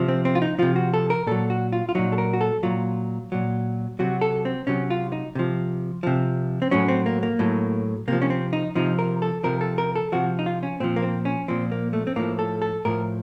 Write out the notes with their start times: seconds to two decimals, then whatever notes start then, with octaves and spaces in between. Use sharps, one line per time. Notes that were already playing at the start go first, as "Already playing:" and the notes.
Already playing: C3 F3
0.08 C4
0.25 C4
0.35 F4
0.42 D#4
0.59 C3 F3 F4
0.76 F#4
0.94 A4
1.10 A#4
1.27 A#2 F#3 A4
1.50 F#4
1.73 F4
1.89 F4
1.95 A#2 F#3 D#4
2.12 A4
2.18 A#4
2.33 F#4
2.41 A4
2.63 A#2 F#3 F4
3.32 A#2 F#3
3.99 C3 F#3 F#4
4.21 A4
4.45 C4
4.67 C3 F#3 C#4
4.90 F4
5.12 D#4
5.35 C3 F3
6.03 C3 F3
6.62 C4
6.71 A2 F#3 C#4
6.88 C4
7.06 A#3
7.23 A#3
7.39 A2 F#3
8.08 C3 F3 A#3
8.22 C#4
8.30 C4
8.53 D#4
8.75 C3 F3 D#4
8.99 A#4
9.22 A4
9.44 C3 F3 A#4
9.61 A4
9.78 A#4
9.96 A4
10.12 C3 F3 F#4
10.39 D#4
10.46 F4
10.63 C#4
10.80 A#2 F3 C4
10.96 A#3
11.02 C4
11.25 C#4
11.48 A#2 F3 C4
11.72 A#3
11.93 A3
12.07 C4
12.16 A2 F3 A#3
12.39 A4
12.62 A4
12.85 A2 F3 A#4